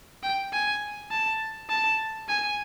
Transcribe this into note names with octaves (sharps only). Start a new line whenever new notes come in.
G5
G#5
A5
A5
G#5